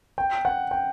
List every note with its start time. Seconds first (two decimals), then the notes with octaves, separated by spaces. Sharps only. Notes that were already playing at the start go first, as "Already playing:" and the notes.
0.18 G5
0.45 F#5
0.71 G5